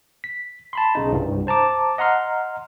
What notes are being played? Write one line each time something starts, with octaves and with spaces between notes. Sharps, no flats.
B6
A5 B5 C6
B1 C#3 D#4
C2 G2
C5 A5 A#5 D6
D#5 F#5 A#5 C6 F6